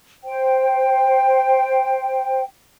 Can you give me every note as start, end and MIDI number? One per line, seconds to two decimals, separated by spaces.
0.24 2.42 72
0.24 2.42 79